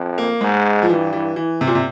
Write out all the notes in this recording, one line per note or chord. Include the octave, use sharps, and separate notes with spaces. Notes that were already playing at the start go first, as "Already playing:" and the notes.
Already playing: F2
A#3
G#2 G#3
F3
G2 E3
E3
E3
C3
A#2
C3